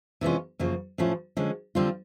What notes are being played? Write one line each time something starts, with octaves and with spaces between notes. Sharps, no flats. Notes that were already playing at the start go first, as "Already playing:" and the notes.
C3 E3 G#3 C#4 F4
F#2 C#3 F3 A#3
A2 F3 A3 C#4 F4
D3 F3 G#3 C#4
D3 G3 C4 F4